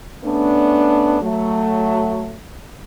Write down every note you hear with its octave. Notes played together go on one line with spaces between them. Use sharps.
A3 B3 C#4 D4
F#3 A3